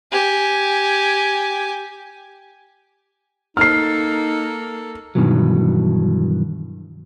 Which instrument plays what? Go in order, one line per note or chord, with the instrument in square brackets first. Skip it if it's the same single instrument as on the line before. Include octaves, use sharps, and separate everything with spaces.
[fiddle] G4 G#5
[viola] A#3 A4 [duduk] D#4 [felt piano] F6 C7
[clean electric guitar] G2 B2 D#3 E3 F#3